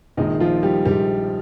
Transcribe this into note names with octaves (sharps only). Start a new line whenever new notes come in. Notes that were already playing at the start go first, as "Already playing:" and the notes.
A#1 A#2 D#3 G#3 D#4
F3 F4
G3 G4
A#1 A#2 G3 G#3 G4